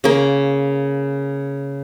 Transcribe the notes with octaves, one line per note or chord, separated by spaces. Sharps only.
C#3 A#3